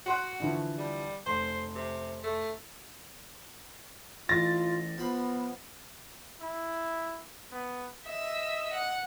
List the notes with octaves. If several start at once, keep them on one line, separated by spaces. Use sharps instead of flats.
F#4 F#5 C6 F#6
D3 E3 F3
G3
F1 C5 C6
C3
A3
A1 F4 A6 A#6
F3 B3 B5
E4
B3
D#5 E5 E6
F#5